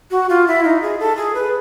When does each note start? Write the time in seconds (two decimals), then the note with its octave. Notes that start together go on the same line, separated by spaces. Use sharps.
0.11 F#4
0.29 F4
0.47 E4
0.64 D#4
0.82 G#4
1.00 A4
1.17 G#4
1.35 B4